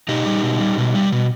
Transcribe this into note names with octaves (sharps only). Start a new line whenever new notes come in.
B2 D#4 G4
G3
B2
G3
B2
G3
B2